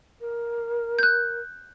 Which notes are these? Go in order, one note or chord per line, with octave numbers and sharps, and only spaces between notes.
A#4
F#6 G6